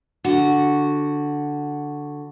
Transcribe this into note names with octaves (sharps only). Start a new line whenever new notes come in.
D3 F#4